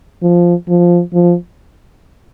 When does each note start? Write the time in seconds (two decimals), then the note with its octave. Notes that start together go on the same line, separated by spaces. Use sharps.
0.23 F3
0.68 F3
1.13 F3